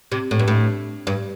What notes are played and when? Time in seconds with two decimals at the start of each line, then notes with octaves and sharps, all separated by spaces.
0.12 C3
0.31 A2
0.39 G2
0.48 A2
1.07 G2